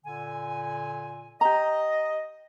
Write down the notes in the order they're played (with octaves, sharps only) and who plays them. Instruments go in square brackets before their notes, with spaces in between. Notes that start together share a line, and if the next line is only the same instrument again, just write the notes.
[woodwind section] A#2 D3 G#5
[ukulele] G4 A#5 [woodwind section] D#5